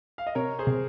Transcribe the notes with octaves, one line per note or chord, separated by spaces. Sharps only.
F5
D#5
C3 A#4 C#5
G#4 C5
C3